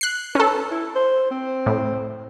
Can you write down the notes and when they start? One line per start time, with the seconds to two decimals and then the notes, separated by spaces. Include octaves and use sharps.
0.01 F#6 C7
0.35 C#4 A4 B4
0.71 E4
0.96 C5
1.31 C4
1.66 A2